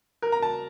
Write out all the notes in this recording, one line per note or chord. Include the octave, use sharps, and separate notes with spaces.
A#4
A#5
A5